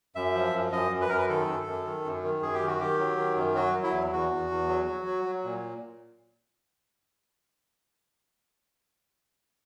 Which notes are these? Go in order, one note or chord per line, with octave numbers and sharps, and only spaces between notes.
F#2 E5
F3
F#2
F#2 D#5
F#2
B4
F#2 A#4
B4
D#3 A4
F#2
F#2
D#3
F#2
D#3
F#2 G#4
G4
D#3
F#4
D#3 G4
F#3
D#3
F#2
F#3 F#4
F#3
E4
E2
E2 F#4
E2
E2
F#3
F#3
F#3
F#3
A#2